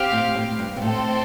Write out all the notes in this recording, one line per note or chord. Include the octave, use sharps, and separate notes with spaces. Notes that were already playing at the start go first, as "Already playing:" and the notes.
Already playing: C4 G4 F5
A2
A2
G2
C3
A2 C4 A4 C5